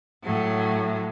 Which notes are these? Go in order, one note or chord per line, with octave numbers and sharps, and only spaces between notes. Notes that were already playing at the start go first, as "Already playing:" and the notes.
A2 F#3